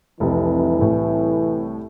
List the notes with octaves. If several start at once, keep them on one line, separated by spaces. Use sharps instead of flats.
F1 C2 E3
C2 A2